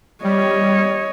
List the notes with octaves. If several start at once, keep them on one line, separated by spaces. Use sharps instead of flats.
G3 C#5 D#5